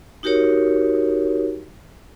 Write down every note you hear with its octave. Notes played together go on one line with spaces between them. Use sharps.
D#4 F#4 G4 A#4 C#5